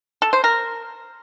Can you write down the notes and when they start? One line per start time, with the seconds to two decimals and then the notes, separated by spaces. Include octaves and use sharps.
0.22 A4
0.33 C5
0.44 A#4